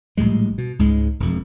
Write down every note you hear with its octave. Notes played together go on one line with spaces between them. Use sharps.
A#1 A2 G3 G#3
B2
C#2 G#2 C#3 G#3
E1 F2